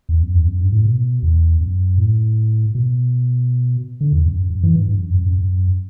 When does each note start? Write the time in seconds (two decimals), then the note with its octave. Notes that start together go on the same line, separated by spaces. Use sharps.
0.09 E2
0.22 F#2
0.34 E2
0.47 F#2
0.60 G2
0.72 A2
0.85 B2
1.23 E2
1.61 F#2
1.98 A2
2.75 B2
4.01 D3
4.13 E2
4.26 F#2
4.50 F#2
4.63 E3
4.76 G2
4.89 G2
5.01 F#2
5.14 F#2
5.26 F#2
5.38 F#2